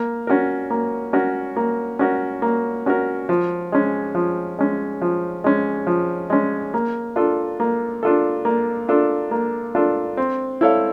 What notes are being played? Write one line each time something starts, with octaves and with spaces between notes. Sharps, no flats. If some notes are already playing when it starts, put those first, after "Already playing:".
Already playing: A#3
C#4 F#4 A#4
A#3
C#4 F#4 A#4
A#3
C#4 F#4 A#4
A#3
C#4 F#4 A#4
F3
G#3 C#4
F3
G#3 C#4
F3
G#3 C#4
F3
G#3 C#4
A#3
D4 F4 A4
A#3
D4 F4 A4
A#3
D4 F4 A4
A#3
D4 F4 A4
C4
E4 A4 C#5 F5